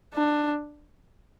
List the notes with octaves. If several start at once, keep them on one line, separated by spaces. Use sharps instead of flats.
D4